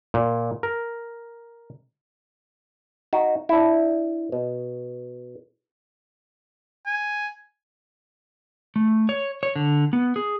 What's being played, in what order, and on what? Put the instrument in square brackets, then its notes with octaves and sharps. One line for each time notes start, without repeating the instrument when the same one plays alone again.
[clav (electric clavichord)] A#2
A#4
D#4 F#4
D4 E4
B2
[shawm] G#5
[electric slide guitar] A3
C#5
C#5
D3
B3
G#4